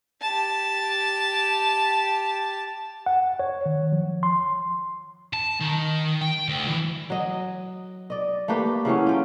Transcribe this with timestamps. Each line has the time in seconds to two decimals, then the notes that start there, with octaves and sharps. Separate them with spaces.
0.22 G4 A5
3.06 F#5
3.40 C#5
3.66 D#3
3.92 F3
4.23 C6
5.34 A5
5.61 D#3
6.21 G5
6.48 D2
6.68 E3
7.10 F#3 D#5
8.10 D5 D#5
8.48 A3 A#3 G4 B4
8.85 C#3 E3 F#3 C#4
9.06 F4 G5